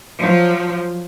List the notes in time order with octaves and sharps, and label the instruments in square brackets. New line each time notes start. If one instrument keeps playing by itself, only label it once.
[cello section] F3 F#3